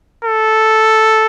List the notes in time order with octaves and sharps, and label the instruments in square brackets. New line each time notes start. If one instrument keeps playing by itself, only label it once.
[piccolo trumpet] A4